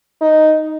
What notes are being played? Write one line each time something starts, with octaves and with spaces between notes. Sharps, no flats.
D#4